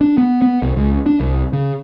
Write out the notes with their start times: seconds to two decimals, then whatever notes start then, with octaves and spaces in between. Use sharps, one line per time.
0.01 D4
0.18 B3
0.42 B3
0.62 C2
0.76 C#2
1.06 D4
1.20 C2
1.53 C#3